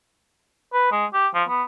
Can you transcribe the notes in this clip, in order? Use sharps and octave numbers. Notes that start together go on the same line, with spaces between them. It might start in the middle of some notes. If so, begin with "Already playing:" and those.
B4
G#3
G4
F3
B3